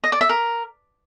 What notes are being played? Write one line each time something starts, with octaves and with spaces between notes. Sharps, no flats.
D#5
D5
E5
A#4